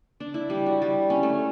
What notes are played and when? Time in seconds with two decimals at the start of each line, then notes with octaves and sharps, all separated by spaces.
0.20 D4
0.34 E4
0.50 G3
0.66 F#4
0.82 G3
1.10 C#4
1.23 A3